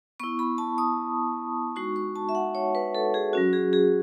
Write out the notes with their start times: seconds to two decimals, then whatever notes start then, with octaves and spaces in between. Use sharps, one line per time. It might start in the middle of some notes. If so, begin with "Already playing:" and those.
0.20 B3 E4 C#6
0.39 B5
0.58 A5
0.78 D#6
1.76 G#3 D#4 F#4 C#6
1.96 C#6
2.16 A5
2.29 E5
2.35 F#5
2.55 C#5
2.75 B4
2.95 A4
3.14 G#4
3.33 F#3 C#4 F#4
3.53 G#4
3.73 G#4